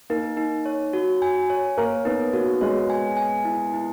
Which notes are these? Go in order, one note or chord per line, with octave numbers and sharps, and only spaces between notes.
A#3 D#4 A#4
D#4
C#5
F#4
G#5
C#5
A#3 A#4 C#5
B3 D#4 B4
A#3 F#4 A#4
G#3 G#4 C#5
G#5
G#5
E4
E4